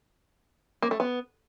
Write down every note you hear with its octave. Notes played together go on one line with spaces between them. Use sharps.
A#3
A3
B3